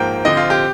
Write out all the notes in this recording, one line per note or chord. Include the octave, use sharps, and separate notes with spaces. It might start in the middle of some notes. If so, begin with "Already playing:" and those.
Already playing: G#2 F3 A#3 G5
D3 F3 C4 D#5
F4
G4